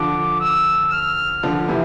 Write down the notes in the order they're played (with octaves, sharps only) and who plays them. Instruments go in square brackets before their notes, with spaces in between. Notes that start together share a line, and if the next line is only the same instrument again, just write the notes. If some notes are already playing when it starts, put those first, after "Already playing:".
Already playing: [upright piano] D3 F3 [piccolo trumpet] D6
[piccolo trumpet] E6
F6
[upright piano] D3 F3
C3 E3